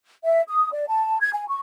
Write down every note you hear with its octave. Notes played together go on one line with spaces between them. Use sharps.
E5
D#6
D5
A5
G#6
G#5
C#6